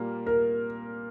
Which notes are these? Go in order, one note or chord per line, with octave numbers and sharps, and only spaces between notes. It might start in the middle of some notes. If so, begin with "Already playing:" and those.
Already playing: A#2 G3 A#3
A#4